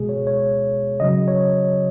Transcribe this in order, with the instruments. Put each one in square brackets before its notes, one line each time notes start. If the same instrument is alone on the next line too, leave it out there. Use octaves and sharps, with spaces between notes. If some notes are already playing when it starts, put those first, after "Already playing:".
Already playing: [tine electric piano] B2 G#3 G#4
C#5
C#5
C#3 F#3 D#5
C#5